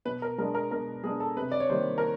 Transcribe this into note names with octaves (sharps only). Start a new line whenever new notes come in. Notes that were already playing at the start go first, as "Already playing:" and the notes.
B2 B4
A#4
G#3 B3 D4 A#4
A#4
B2 A#4
G#3 B3 D4 G#4
A4
C3 B4
D5
C#5
D#3 G3 A#3 C5
A#4